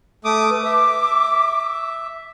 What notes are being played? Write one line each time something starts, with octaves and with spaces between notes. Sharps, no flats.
A3 D6 D#6
B4
E5 D6